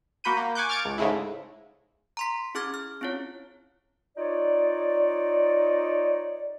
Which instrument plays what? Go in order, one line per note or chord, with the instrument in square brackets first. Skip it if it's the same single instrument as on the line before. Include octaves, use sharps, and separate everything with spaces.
[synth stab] A#3 F#4 B5 G6 D#7
A#3
G#5 C#6 D6 F#6 G6
D6 F6 G#6 A6 C#7 D7
C#2
G#2 C#3 G#3 A3 E4
[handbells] A#5 C6 B6
C#4 E4 G#4 D6 F6 G#6
F6
C4 C#4 E4 F4 C#5
[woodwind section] D#4 F4 C#5 D5